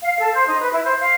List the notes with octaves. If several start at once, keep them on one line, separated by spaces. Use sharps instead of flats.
F5
A4
C5
D#4
B4
E4
C5
F5